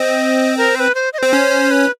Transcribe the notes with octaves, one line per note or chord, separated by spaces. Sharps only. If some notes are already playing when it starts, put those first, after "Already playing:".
Already playing: C4 D#5
A#4
C5
B4
C5
D#5
C4 C5
C#4
B4